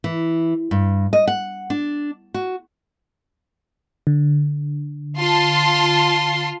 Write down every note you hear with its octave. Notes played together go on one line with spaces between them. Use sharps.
E3
G2
D#5
F#5
D4
F#4
D3
F4 A5 C6